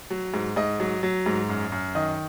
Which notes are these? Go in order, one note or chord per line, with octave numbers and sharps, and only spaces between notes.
F#3
G#2
G#2 D#5
F#3
F#3
G#2
F#2
F#2
D#3 D#5